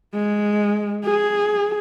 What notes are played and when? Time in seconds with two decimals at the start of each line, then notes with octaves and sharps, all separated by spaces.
0.14 G#3
1.04 G#4